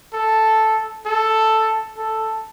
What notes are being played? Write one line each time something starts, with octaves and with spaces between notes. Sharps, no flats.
A4
A4
A4